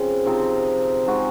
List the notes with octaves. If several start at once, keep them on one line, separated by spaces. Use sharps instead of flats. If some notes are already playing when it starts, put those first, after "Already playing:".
Already playing: C#3 F3 C4
C3 F3 C4 D#4
G#3 D#4 F#4